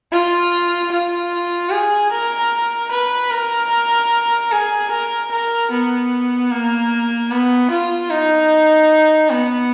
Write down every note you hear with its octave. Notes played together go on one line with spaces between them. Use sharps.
F4
F4
G#4
A#4
B4
A#4
G#4
A#4
A#4
B3
A#3
B3
F4
D#4
B3